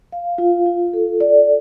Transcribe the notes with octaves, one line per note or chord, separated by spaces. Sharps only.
F5
F4
F4
A4
D5